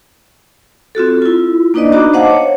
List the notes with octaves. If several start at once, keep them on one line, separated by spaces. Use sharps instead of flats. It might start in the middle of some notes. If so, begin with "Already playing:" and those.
C4 F4 F#4 A4
E4 F4
A#3 D4 D#4 B4 D5 D#5
B3 D4 D#4 F#4 A#5 D6
C5 D#5 F5 F#5 A5 D6
C#5